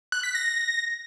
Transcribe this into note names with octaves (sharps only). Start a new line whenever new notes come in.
F#6
B6
A#6